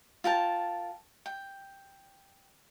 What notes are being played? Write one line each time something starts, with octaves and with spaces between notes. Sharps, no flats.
F4 A#4 G5 A5
G5